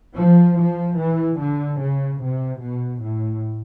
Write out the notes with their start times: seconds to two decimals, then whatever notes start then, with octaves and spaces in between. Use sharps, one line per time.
0.16 F3
0.56 F3
0.98 E3
1.37 D3
1.78 C#3
2.20 C3
2.60 B2
3.01 A2